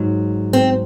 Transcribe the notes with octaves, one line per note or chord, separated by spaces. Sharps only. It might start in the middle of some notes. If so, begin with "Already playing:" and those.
Already playing: G#2 F#3
C4